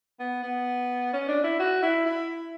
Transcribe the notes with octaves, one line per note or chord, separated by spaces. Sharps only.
B3
B3
C#4
D4
E4
F#4
E4
E4